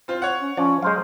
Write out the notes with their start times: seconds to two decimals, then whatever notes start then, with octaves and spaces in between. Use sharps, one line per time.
0.08 C4 F4 C5
0.22 C#5 F#5
0.42 C#4
0.57 F3 C#4 D5
0.83 F#3 G#3 C5 F5